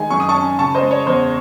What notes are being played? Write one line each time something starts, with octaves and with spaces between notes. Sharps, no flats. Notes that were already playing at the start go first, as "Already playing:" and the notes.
Already playing: D#3 G#3 G#5
F#2 C#6
D#6
A5 C#6
C#4
C#3 A5 C#6
C5 D#5
G#3
C#5
E2 C5